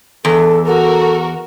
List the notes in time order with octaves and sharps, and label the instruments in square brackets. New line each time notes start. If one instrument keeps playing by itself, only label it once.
[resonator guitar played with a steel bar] E2 [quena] A4
[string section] F#4 A#4 [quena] A4